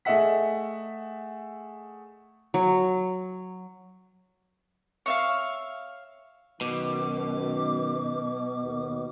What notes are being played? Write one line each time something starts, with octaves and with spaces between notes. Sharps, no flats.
A3 G#4 D#5 E5 F#5 B6
F#3
C#5 E5 F5
F#2 B2 D#3 D6
D#2